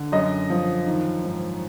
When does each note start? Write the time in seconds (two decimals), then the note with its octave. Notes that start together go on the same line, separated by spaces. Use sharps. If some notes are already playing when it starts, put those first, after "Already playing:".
Already playing: D3
0.12 F#2 D#5
0.50 F3
0.87 D#3
1.24 G#2